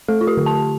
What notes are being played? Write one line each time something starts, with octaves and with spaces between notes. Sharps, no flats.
A3 A4
F4
G4
D3
A5